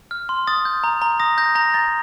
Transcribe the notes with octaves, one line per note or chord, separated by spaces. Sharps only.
F6
C6
D#6 A6
G6
A#5
A#5
D#6 A#6
G6 A#6
A#5 A#6
A#5 A6